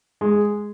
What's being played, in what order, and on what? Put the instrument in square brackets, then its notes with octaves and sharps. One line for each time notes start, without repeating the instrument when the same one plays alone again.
[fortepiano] G#3